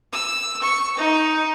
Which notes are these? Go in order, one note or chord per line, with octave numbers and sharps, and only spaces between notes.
E6
C#6
D#4